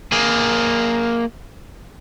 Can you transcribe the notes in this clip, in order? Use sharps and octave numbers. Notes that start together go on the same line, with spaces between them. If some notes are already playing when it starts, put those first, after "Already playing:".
A#3 G#4